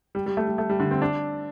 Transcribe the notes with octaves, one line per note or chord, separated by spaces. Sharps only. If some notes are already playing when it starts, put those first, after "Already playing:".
G3
G3
A3
G3
A3
G3
D3
C4
D4